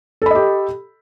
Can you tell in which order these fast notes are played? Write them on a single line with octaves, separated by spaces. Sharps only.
A4 B5 D#5 G4